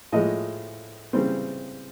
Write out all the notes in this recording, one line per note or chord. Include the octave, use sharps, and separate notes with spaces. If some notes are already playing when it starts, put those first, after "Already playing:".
A2 F3 G#3 D#5
C#3 E3 G3 C4